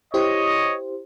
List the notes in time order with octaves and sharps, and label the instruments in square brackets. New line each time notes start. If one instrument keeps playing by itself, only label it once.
[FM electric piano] E4 G4 C5 [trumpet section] C#5 D#5